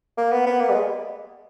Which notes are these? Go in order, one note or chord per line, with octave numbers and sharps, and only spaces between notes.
A#3
B3
B3
A#3
G3
G#3